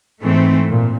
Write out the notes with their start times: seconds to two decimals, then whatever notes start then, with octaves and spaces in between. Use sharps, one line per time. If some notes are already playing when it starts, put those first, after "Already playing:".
0.22 G#2 E3 A3 C4
0.68 A#2